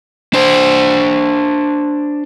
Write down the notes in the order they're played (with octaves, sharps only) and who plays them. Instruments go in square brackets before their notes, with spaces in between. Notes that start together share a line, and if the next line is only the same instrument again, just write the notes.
[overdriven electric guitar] D4 C5